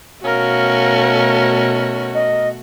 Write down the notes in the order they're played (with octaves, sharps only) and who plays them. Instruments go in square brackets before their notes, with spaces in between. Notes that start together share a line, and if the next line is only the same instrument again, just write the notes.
[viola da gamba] B2 A3 F#4 [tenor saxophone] C#4 [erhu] A#4 [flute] F5
[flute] D#5